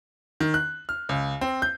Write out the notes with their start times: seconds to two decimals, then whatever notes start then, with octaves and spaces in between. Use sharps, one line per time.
0.40 D#3
0.54 F#6
0.89 F6
1.09 C#2
1.41 C4
1.62 G6